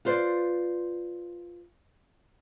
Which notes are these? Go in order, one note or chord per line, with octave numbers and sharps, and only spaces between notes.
F4 B4 C5 D5